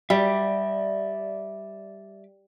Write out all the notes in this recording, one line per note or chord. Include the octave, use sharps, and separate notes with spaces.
G3 D5 E5